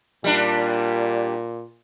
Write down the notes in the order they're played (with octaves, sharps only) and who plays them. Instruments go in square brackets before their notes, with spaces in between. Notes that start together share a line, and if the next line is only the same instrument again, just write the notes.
[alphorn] A#2 [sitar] G3 D4